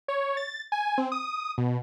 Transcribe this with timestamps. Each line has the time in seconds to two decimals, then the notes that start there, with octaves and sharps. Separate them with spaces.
0.08 C#5
0.37 A6
0.72 G#5
0.98 C4
1.12 D#6
1.58 B2